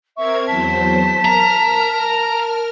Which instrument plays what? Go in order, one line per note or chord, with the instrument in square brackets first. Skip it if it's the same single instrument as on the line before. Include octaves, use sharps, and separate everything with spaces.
[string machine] C4 A#4 G#6 [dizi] E5 [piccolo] C#6
[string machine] E2 F#3 C5 [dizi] A5 [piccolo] B6
[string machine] A#4 F6 [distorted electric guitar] A#5